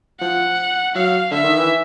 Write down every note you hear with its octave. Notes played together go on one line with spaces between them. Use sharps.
F3 F#5
F#3 F5
D3 E5
D#3
E3